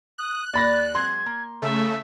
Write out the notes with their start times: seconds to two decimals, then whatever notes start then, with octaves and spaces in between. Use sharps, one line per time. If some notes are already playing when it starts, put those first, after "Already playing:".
0.18 D#6 F#6
0.54 D#2 D5 B5 A6 A#6
0.95 F#3 G#3 C4 C6 G#6
1.26 A#3
1.62 C#3 A3 E5